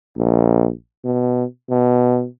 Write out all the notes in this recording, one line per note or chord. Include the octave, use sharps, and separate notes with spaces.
A#1
B2
B2